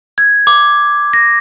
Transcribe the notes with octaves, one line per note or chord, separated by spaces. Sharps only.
G#6
D6
A#6